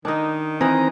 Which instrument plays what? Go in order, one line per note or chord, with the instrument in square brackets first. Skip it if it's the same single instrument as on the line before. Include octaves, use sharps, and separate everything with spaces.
[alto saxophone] D#3 [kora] D4 D#4
[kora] E3 D#4 A#4 [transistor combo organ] C4 A#5